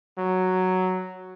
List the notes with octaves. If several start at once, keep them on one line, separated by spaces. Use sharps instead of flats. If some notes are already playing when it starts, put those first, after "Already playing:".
F#3